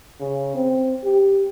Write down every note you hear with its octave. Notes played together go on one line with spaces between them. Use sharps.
C#3
C4
G4